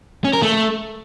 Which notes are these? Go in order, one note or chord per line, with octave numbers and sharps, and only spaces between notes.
C#4
A#4
A3